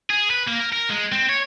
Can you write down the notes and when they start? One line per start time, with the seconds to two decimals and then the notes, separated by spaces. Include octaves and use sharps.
0.10 G#4
0.30 B4
0.48 A#3
0.60 A#4
0.73 A#4
0.90 G#3
1.12 C4
1.29 C#5